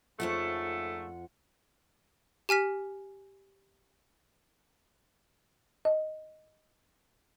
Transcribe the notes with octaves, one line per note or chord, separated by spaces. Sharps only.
F2 G#2 C#3 A3 F4 F#5
G4 G#5 F6 B6
D#5